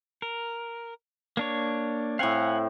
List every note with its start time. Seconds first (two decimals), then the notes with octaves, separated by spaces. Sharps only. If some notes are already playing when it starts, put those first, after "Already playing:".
0.22 A#4
1.37 A#3 D4 C#5
2.19 A2 C4 F5 F#5 G#5